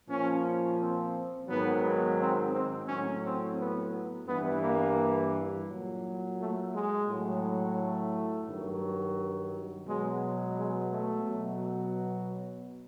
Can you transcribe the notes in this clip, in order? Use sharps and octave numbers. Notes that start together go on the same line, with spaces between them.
A#2 F3 C#4
C4
G#2 D#3 F#3 B3
C4
C4
A2 F#3 C#4
C4
B3
G2 E3 B3
A#3
A#2 F#3
A3
G#3
A2 F#3
A3
G2 D#3 F#3
B2 F#3 G#3
G#3
A3
B2 F#3